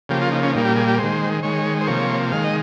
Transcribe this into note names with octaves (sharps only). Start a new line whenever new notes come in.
C#3 F3 A#3 G4
F4
D#4
C#4
A#2 G3 A#3 D#4
G4
G#4
G4
D#3 G#3 C5
D#3 G#3 C#5
C5
C3 F3 A#3 C#5
D#3 G#3 F5
D#5